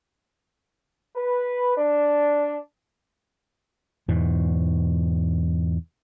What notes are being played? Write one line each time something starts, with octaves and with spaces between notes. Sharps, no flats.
B4
D4
E2 G#2 B2